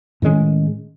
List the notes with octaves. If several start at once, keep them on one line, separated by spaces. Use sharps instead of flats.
A2 D#3 G#3 C#4